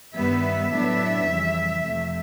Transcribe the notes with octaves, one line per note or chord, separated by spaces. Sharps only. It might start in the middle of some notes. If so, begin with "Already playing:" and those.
G2 D#3 G3 B3 E5
A2 F#3 B3 D4
F2 C#3 E3 G3
F2 C3 F3 A3